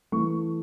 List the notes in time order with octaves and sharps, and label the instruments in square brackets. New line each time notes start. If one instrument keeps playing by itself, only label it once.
[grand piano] E3 A3 C#6